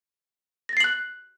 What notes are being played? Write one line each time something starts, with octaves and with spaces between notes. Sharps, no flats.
F#6 A6 A#6 C7 F#7